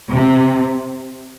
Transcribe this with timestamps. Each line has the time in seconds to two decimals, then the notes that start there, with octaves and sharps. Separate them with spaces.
0.11 C3